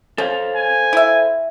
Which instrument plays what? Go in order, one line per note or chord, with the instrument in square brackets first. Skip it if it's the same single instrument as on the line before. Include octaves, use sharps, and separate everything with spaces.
[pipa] C#4 [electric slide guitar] A4 C5 F5
[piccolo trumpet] G#5
[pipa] E4 E5